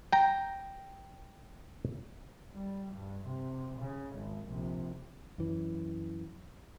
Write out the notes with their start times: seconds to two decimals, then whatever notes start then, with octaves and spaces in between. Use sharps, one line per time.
0.13 G5 A#5
2.54 G3
2.94 G2
3.27 C3
3.79 C#3
4.17 G#1
4.47 A#1 C3
5.38 F#2 E3